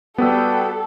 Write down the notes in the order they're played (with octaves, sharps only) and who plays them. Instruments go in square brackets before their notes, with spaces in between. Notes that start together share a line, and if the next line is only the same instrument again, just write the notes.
[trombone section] G3 F#4 G4 [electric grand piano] B3 B4 E6 [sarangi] A4